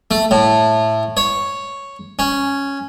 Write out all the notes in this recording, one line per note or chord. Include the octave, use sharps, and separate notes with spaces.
A3
A2
C#5
C#4